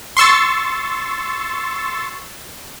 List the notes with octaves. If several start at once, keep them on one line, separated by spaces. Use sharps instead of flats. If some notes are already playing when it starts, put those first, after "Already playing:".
C6 C#6 E6 A6